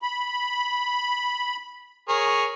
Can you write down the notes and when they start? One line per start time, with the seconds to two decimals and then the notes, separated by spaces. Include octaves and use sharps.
0.02 B5
2.09 G#4 A#4 C#5